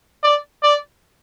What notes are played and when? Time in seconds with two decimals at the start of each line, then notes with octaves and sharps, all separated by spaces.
0.23 D5
0.63 D5